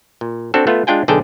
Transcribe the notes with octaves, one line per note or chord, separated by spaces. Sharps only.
A#2
C4 D4 F#4 A4
A3 B3 F4
G#3 D4 F4 G5 G#5
B1 D3 G#4 G5 A5 A#5